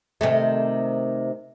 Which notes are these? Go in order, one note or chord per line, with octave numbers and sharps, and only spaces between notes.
C3 D#3 A3